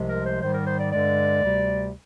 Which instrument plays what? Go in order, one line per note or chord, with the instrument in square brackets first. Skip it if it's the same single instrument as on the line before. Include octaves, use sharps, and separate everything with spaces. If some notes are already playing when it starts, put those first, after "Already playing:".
Already playing: [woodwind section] C2 C3 F3 G#3
A#4
C5
G#2 D#3 G3 C5
A#4
C5
D5
G2 D3 G#3 D5
D2 C3 G3